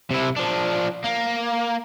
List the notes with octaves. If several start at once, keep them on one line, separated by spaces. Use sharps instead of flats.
C3 E4
F3 D4
A#3